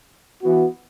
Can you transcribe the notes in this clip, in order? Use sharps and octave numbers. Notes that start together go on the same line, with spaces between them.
E3 B3 F#4